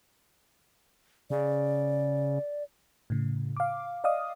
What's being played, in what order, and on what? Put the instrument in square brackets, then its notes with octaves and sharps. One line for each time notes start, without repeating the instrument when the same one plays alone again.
[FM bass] C#3 [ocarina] D5
[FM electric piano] A2 C#3
F5 D6
D5 D#5 F5 D#6